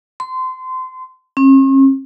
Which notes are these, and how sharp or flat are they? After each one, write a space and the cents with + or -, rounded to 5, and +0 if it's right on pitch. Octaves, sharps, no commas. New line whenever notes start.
C6 -25
C#4 -45